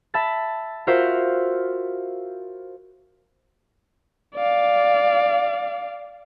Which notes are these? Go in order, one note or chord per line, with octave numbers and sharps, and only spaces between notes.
E5 A5 B5 A6
F4 F#4 A#4 C5 E5 F5
D5 F5